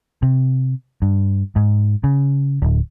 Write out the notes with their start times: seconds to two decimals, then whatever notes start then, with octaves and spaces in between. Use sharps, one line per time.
0.22 C3
1.02 G2
1.56 G#2
2.04 C#3
2.62 D1